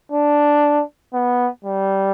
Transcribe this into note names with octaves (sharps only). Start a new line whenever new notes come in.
D4
B3
G3